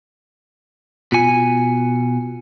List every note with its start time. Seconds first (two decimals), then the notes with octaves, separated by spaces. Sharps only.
1.12 B2 F4 G#5 C#7